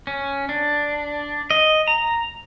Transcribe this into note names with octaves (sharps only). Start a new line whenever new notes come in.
C#4
D4
D#5
A#5